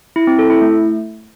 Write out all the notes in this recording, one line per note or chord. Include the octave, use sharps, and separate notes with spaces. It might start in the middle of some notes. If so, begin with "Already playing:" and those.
E4
C4
A4
E4
A3